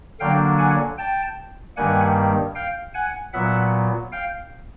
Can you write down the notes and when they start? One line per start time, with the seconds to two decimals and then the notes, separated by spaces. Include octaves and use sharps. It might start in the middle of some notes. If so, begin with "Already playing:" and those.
0.20 D3 F#3 A#3 D4 F5 G5
0.59 F#5 G#5
0.98 G5 A5
1.77 G2 D#3 G3 A#3 F#5 G#5
2.55 F5 G5
2.94 F#5 G#5
3.33 A#2 F#3 B3 E5 F#5
4.12 F5 G5